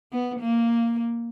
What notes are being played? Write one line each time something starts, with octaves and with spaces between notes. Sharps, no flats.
B3
A#3